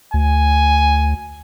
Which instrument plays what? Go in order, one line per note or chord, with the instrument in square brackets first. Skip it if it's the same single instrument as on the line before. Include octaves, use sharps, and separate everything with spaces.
[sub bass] D2 [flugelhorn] G#5